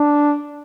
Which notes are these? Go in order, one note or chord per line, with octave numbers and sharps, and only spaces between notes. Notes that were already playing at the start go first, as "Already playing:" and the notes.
Already playing: D4